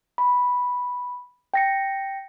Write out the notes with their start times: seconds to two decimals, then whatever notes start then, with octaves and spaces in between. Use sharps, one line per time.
0.18 B5
1.54 G5 A#6 C#7